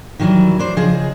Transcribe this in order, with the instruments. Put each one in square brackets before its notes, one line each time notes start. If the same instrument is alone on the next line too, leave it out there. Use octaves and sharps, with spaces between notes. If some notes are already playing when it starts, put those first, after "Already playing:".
[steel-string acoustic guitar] D#3 E3 F#3 G3 E4
D4 C5
C#3 F3 G#4 D#5